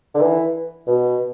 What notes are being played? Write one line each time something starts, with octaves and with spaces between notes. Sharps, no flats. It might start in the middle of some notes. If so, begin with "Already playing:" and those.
D3
E3
B2